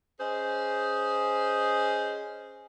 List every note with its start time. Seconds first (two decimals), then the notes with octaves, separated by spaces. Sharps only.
0.20 C#4 G#4 C5 D#5